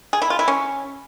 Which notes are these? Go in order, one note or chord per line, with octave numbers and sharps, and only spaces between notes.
G#4
E4
F4
E4
C#4